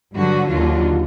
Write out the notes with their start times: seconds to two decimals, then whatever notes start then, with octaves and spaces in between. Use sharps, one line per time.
0.14 G2 D3 F#3 F#4
0.48 D#2 D3 F#3 F4